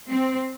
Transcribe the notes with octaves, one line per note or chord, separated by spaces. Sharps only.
C4